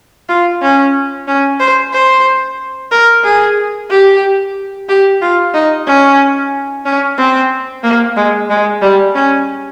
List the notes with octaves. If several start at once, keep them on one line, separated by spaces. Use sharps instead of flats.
F4
C#4
C#4
C5
C5
A#4
G#4
G4
G4
F4
D#4
C#4
C#4
C4
A#3
G#3
G#3
G3
C#4